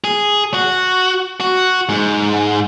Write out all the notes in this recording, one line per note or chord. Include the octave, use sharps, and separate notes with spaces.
G#4
F#4
F#4
G#2